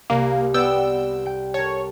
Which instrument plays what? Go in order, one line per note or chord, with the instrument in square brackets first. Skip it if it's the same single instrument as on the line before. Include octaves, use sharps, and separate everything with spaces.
[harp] C2 [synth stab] A#3
[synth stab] B3 G5 E6 [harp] D5 F#5
[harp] G5
[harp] A#4 A5 [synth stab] C#5